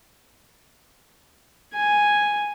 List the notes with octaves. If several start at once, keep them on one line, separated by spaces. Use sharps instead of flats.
G#5